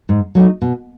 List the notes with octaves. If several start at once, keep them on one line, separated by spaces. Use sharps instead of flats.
G#2
F#3 A3 D#4
B2